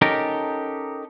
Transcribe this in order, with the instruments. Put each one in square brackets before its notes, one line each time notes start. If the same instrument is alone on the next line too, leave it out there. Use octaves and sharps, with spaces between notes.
[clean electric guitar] C#4 D#4 G4 A4 A#4